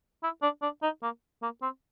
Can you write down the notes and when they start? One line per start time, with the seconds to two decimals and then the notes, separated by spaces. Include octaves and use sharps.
0.23 E4
0.42 D4
0.62 D4
0.83 D#4
1.03 A#3
1.42 A#3
1.62 C4